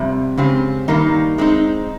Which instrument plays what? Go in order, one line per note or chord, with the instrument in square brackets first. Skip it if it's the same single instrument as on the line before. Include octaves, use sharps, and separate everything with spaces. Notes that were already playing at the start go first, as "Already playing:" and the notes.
Already playing: [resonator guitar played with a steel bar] F2 C3 G3
C#3 G#3 C4 G4
G2 D#3 G3 A#3 D#4
G#3 C4 D#4